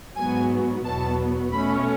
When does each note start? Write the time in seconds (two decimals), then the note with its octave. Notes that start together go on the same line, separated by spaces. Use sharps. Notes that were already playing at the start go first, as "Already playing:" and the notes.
0.16 G#2 F#3 B3 G#5
0.85 E2 B2 F#3 B3 A5
1.52 B2 A3 C#4 B5